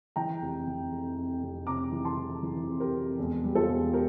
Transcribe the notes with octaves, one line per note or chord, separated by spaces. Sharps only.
E3 G5 A#5
F1
F1
F2
F2
F1
C3 A#5 D6
E3
A5 C6
E3
E3
F2
G4 A#4
F2
E1
G3
F4 A4
E1
G4 A#4